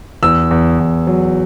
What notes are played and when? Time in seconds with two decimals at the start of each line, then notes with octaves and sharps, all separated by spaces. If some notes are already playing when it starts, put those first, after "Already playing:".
0.23 E2 E6
0.51 E2
0.79 E2
1.07 F#3